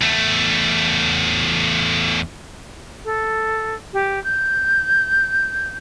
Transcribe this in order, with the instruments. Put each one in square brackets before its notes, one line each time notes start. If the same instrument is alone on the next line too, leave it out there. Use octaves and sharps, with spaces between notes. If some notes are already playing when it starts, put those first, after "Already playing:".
[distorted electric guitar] E2 A3
[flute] A4
G4
G6